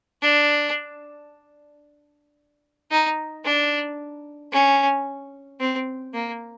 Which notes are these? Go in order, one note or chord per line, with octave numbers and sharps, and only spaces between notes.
D4
D#4
D4
C#4
C4
A#3